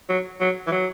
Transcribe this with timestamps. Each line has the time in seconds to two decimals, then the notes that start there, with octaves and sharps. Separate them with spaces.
0.09 F#3
0.40 F#3
0.67 E3
0.72 F#3